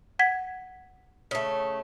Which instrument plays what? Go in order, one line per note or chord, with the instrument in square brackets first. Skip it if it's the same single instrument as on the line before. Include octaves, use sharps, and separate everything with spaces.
[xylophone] F#5 G#6 B6
[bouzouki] C#3 A3